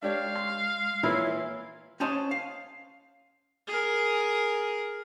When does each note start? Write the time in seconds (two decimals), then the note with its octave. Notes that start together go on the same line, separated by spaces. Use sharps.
0.03 G#3 D4 G4 C#5 F5
0.36 C6
1.03 A#2 E3 E4 C#5
2.00 C#4 C5 C#5 D#5 A5 C6
2.31 F5
3.67 G#4 A#4